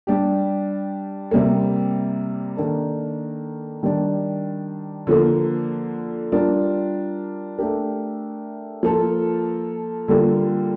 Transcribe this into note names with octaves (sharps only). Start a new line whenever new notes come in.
G3 D4 G4
C3 G3 A#3
D#3 A#3 D4 A4
D#3 G3 D4
D3 F3 A#3
G3 D4 F4 A#4
A3 D4 G4 A#4
F3 A#3 F4 A4
D3 G3 A#3 F4